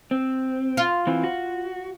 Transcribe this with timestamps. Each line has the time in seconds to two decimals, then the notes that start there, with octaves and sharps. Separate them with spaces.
0.11 C4
0.77 F4
1.07 E3 C4
1.23 F#4